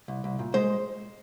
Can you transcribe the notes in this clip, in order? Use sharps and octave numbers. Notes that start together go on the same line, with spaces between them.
C2
C2
A#2
G#3 C5